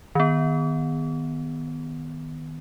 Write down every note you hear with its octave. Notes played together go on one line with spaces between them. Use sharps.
D#3 B3